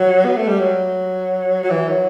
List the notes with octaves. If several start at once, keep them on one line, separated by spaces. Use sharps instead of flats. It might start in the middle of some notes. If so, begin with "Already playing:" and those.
Already playing: F#3
B3
A3
G3
F#3
F#3
E3
F#3